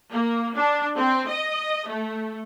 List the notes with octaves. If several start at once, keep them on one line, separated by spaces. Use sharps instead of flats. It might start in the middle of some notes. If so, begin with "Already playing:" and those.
A#3
D4
C4
D#5
A3